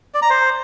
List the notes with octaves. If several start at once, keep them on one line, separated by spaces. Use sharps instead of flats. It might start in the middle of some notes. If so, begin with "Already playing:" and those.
D5
A#5
C5